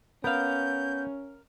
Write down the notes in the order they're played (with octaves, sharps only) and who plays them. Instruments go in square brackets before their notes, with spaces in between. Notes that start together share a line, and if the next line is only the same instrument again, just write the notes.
[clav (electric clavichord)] B3 [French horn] C#4 [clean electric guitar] A#4 F5 [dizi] G6